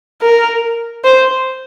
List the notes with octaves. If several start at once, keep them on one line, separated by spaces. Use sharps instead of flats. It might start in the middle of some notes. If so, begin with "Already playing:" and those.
A#4
C5